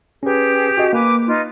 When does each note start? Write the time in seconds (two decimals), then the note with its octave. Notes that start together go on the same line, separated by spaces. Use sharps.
0.23 C#4 G4 G#4 B4
0.78 F#4 D#5
0.93 A#3 B4 G#5 D6
1.26 D#4 F4 B4